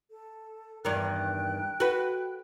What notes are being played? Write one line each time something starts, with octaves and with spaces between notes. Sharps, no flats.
A4
E2 G2 D#3 G5 F#6
F#4 B4